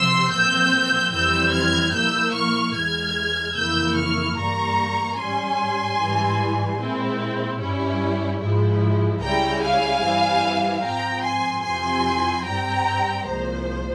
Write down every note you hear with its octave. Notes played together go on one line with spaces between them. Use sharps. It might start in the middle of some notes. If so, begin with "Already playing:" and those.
Already playing: C3 F3 C4 C6 E6
A#2 F3 C4 E6 G6
F2 E3 G3 C4 E4 E6 G6
F6 G#6
A#2 F3 A#3 E4 E6 G6
C#6 F6
E2 E3 G#3 F6 G#6
F2 C#3 E3 A#3 E4 E6 G6
C#6 F6
G2 E3 G3 A#3 A#5 C#6
G#2 G3 C#4 G#5 C6
G#2 E3 G3
A#2 G#3 C4 E4
G2 G3 C#4 E4
G#2 F3 G#3 E4
C#2 C#3 G3 C#4 E4 G5 A#5
F5 G#5
G2 E3 G3 C4 E4
G#2 F3 C4 G5 A#5
G#5 C6
F2 C3 F3 C4 E4 G#5 C6
G2 G3 C4 G5 A#5
C2 A#2 F3 G#3 C5